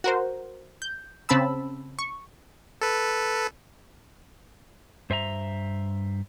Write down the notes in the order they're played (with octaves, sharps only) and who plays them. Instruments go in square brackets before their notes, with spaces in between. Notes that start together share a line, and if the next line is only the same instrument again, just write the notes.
[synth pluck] F#4 A#4 C5
G6
C#3 C4 A5 B5 E6
C#6
[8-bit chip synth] A4 B4
[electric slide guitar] G2 C5 E5 G#5 A#5